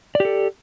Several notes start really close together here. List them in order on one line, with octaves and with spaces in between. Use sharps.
D5 G4 A4